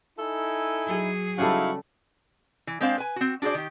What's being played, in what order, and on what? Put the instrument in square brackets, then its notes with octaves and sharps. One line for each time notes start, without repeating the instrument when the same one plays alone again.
[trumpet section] D#4 E4 G#5 [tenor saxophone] A4
[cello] F#3 G#4
[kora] C#3 G3 A4 [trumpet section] D#4 E4 F5 [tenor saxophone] F#4
[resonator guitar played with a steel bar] E3
G#3 C4 D4 C5 F5
B4 G#5
C4 F#4
D4 F#4 G#4 C5 D5
D#3 G4